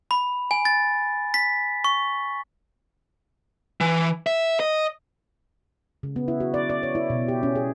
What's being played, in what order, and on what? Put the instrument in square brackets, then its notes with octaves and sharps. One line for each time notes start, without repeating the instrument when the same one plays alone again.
[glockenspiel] B5
G#5
A6
B6
C#6
[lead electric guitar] E3
E5
D#5
[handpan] C#3
B3
E4
F#4
D5
D5
C#5
E4
B2
G4
C#4
G#4